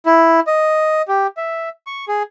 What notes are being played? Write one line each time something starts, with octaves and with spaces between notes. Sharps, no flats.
E4
D#5
G4
E5
C#6
G#4